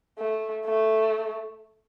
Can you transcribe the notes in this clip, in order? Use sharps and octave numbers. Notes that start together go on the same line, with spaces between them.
A3
A3